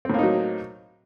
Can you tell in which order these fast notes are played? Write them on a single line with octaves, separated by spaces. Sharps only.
C4 A2 A#3 D#4 F#3